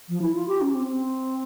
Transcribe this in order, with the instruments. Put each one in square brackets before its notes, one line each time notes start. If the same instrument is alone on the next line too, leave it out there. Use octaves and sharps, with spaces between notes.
[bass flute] F3
E4
F4
G4
C#4
C4
C4